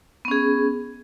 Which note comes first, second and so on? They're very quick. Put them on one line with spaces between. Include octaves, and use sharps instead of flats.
B3 C#4 G#4